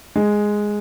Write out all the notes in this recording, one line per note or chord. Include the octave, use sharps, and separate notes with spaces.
G#3